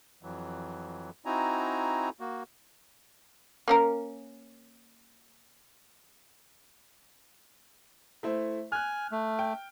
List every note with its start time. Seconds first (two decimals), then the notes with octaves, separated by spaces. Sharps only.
0.23 F2 E3 F#3
1.26 C4 D#4 E4 F#4 G#5 A#5
2.20 A#3 F#4
3.68 A#3 C#4 A#4
8.23 A3 E4 C5
8.72 G#5 F6 F#6
9.12 A3
9.39 G5